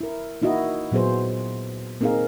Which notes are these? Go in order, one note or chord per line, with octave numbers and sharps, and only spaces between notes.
E4 A#4
A#3 D#4 E4 F#4 D#5
A#2 F#3 B3 G#4 C5
A#3 C4 D#4 G#4 A#4 F5